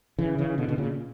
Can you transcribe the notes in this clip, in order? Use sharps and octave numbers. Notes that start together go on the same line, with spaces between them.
C#3 E3
C#3 E3
B2 D3
B2 D3
A#2 C#3